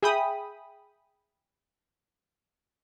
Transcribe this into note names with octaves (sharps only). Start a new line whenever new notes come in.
G#4 E5 G5 B5 D#6